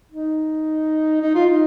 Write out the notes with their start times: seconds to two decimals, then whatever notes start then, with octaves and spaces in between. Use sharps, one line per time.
0.12 D#4
1.22 D#4
1.34 F4
1.47 D#4